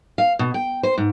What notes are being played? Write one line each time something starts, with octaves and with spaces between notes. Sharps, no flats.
F5
B2
G5
C5
G#2